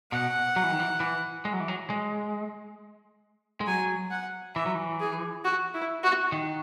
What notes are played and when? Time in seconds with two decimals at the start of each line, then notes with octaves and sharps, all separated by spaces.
0.12 B2 F#5
0.56 F#3
0.63 E3
0.71 D#3
0.80 E3
1.00 E3
1.45 G#3
1.53 F#3
1.60 E3
1.68 F#3
1.90 G#3
3.61 G#3
3.67 F#3 G#5
4.11 F#5
4.55 E3 E5
4.66 F#3
4.75 E3
5.00 G#4
5.45 F#4
5.74 E4
6.03 F#4
6.32 D#3